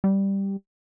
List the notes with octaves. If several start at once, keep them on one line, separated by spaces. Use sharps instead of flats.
G3